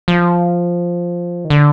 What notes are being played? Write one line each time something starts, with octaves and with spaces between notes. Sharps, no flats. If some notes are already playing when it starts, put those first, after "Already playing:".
F3
D#3
D3